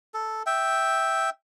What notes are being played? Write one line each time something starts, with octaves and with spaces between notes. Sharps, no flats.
A4
E5 G5